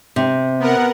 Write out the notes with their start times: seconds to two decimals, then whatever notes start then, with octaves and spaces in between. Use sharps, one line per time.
0.16 C3
0.59 B3 A#4 F#5